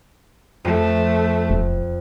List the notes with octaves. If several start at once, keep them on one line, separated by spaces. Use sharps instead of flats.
F2 A3
E1